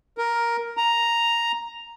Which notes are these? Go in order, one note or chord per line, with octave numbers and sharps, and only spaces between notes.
A#4
A#5